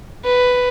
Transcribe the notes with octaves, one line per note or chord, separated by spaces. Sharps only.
B4